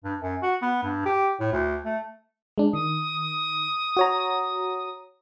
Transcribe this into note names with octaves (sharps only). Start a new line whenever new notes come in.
G2
F#2
F#4
B3
G2
G4
A2
D2
A3
G#3 D4
D#3 D#6
F#4 C#5 A#5